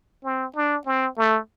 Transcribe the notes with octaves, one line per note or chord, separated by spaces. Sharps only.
C4
D4
C4
A3